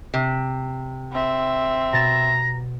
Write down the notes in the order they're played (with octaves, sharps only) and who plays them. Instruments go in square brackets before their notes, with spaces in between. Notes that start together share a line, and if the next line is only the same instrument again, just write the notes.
[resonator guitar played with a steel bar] C3
[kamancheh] C4 E5
[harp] B2 A6 E7 [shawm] A#5